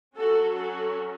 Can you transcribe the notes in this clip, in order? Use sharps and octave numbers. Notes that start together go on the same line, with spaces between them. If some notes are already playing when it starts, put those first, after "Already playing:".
F#3 C#4 F#4 A4
F#4 A4